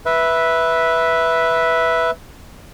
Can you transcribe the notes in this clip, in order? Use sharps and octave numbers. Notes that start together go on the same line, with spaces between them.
B4 E5